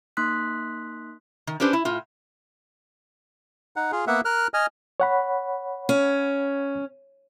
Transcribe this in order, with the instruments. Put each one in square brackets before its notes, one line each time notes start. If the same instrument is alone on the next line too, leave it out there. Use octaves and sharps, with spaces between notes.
[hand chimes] A#3 D#4 C6 D#6 F#6 B6
[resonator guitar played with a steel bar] D#3
C#4 D4 G4 B4 C5
E4
A2 F4
[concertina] D#4 F#5
F4 G#4
A#3 B3 E5 F#5
A#4 F6 F#6
D#5 G#5 F6
[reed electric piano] C#5 F#5 B5
[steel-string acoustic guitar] C#4